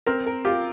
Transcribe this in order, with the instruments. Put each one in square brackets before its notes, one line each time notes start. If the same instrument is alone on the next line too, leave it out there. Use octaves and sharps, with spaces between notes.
[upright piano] C4 [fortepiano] A#4
[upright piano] A#4
[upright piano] F4 [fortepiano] G4